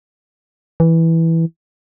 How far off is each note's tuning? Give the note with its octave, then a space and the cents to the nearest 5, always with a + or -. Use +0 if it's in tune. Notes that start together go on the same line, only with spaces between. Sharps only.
E3 -5